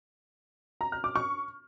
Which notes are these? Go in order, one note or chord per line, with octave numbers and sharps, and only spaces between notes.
A#5
F6
D6
C#6